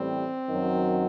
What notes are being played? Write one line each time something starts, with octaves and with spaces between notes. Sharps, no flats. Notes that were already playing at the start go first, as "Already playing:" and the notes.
Already playing: A1 A2 G3 C4
F#2 D#3 F#3